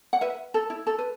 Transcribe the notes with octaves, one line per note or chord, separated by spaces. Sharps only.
F#5
B4 E5
A4
E4
A4
B4